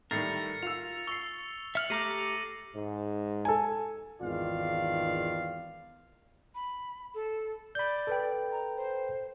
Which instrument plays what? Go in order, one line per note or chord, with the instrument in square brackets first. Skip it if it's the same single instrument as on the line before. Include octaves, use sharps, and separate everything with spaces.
[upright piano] A2 D#3 G3 [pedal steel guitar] A#4 [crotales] A6 C7 C#7
[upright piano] F4 E6 [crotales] F7
[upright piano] C#6 C7 [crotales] E6 G7
[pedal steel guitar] E5 F6 [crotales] C#7 F#7
[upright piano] A3 [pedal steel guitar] G4 A#5 D6 [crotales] A#6 C7 D#7
[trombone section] G#2
[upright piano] A4 G#5
[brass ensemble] G#1 E2 D#3 F4 D5 F5
[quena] B5
A4
[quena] D5 [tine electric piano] B5 G6
[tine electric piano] A4 B4 G5
[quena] A#5
C5